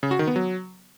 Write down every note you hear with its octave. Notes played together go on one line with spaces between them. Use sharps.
C#3
F#4
D#3
B3
F#3